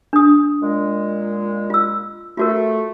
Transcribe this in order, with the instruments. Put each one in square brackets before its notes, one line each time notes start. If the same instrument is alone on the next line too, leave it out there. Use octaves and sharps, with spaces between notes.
[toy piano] D4 D#6
[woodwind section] A#2 G#3
[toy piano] F4 E6
[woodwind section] A3 [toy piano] F4 F#4 A#4